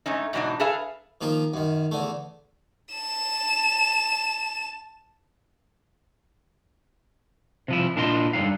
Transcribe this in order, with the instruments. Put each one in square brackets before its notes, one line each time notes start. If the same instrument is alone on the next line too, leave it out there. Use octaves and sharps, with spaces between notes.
[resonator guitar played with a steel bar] G#2 A3 C#4 D#4
G#2 B2 E3 F#3 D4 D#4
G#4 A4 B4 E5 F5
[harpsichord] D#3 F3 A#3 D#4
F#2 D#3
E2 D3 A3
[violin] A5 E7
[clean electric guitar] C3 F3 E4
A#2 D4 E4 F4 D#5 C6
G2 D3 F#3 D#4 F5